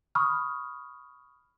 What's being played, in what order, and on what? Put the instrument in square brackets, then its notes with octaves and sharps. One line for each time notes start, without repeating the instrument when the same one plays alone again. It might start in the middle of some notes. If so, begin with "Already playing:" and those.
[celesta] B5 C#6 D#6 F6